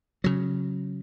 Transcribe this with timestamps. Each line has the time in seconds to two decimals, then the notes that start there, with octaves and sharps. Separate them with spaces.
0.24 C#3 F#3